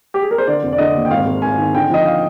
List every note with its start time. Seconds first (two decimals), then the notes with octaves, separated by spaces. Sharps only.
0.14 G4
0.23 G#4
0.31 A#4
0.38 C5
0.47 D3 D5
0.63 F1
0.72 D5
0.78 D3 D#5
0.95 D#2
1.05 G5
1.10 G#1 F5
1.27 G#1
1.42 G#1 G#5
1.58 D#3
1.74 D3 G5
1.89 F3 D#5
2.06 F5